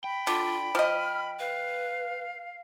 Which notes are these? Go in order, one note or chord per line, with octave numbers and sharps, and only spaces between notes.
G5 B5
D3 F4
F3 D#5 F6
B4 F5